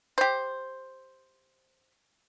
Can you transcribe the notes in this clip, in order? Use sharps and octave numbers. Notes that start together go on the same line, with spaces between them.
G4 C5